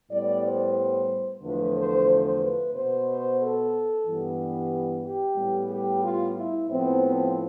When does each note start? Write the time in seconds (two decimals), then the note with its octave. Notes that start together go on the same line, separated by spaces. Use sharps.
0.11 A2 G3 B3 D5
0.44 C5
1.43 E2 D3 F3 A3 B4
1.75 C5
2.09 C5
2.41 B4
2.74 B2 B3 C5
3.07 C5
3.40 A4
4.05 G2 E3 G3 B3
5.03 G4
5.36 A2 G3 B3
5.69 G4
6.02 F4
6.34 E4
6.68 A2 F3 B3 C4
7.01 C4